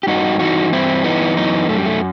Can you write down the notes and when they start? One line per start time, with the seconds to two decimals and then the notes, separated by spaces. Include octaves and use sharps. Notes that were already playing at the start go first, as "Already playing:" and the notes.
0.03 G4
0.07 G2 D#4 F#4
0.39 E3 D#4 F#4
0.72 G2 C4 E4
1.04 E3 B3 D#4
1.37 F#2 B3 D#4
1.69 F#2 A3
1.77 G3
1.86 A3